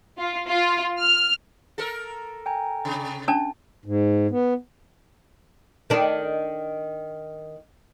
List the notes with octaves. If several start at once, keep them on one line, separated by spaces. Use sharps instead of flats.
F4
F4
F6
A4 A#4
G5 G#5 A#5
C3
C#4 D4 A5
G#2
B3
D#3 D4